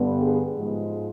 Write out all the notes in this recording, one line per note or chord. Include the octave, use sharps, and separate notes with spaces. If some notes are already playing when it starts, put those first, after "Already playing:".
Already playing: G2 D3 G3 B3
G#4
G#2 F3 G#3